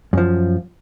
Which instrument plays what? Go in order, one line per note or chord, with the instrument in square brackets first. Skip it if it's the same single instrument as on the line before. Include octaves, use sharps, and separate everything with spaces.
[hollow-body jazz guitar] F#2 F3